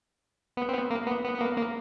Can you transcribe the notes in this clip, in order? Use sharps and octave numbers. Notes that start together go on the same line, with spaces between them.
B3
C4
B3
A#3
B3
B3
B3
A#3
A#3